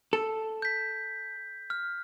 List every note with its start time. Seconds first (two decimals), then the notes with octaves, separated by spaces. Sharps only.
0.13 A4
0.62 G6 B6
1.70 F6